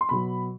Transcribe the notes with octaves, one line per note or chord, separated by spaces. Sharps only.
C6
B2 F#3 B5